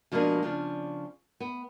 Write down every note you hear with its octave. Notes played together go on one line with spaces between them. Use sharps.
B2 F3 G#3 A#3 D4 G#4
C#3 F3 D4
B3